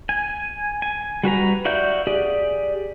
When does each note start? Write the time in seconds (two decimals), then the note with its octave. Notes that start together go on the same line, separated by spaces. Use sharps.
0.09 G#5
0.82 G#5
1.23 G3 F#4 B4 A#5
1.65 F#4 D5 E5 F5 G6
2.07 G4 G#4 D5